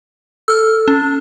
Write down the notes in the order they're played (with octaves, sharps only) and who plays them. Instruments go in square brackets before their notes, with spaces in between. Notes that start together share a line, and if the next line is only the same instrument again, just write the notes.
[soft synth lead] A4 [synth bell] E6 F6
[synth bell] C#4